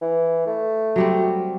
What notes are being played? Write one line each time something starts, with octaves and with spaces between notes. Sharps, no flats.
E3
A3
F#3 G3 C4